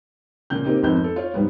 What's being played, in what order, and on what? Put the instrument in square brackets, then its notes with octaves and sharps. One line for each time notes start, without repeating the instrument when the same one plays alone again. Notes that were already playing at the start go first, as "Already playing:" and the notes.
[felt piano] A#2 C#3 G6
A#3 C4 D#4 F4 G4
G#1 F2 B3 G6
A4
F4 C#5
G#2 G3 B3